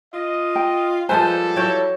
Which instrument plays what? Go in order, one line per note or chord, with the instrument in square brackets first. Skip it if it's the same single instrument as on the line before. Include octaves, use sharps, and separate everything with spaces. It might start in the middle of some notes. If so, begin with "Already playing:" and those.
[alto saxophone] F4 [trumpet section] D#5
[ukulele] G5
[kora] F3 G#3 B4 [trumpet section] G3 A4 [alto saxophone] C5 [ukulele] G#5 A5
[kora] F#3 C#5 G5 [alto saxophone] E4